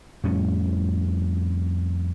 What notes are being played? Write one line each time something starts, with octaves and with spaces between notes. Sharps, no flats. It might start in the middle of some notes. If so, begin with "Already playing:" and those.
F2 A2 G3 C#4